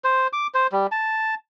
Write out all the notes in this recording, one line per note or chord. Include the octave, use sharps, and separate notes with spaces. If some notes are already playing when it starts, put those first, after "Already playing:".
C5
D6
C5
G3
A5